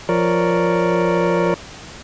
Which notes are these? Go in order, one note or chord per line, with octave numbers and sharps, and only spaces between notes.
F3 A#4 C#5 D5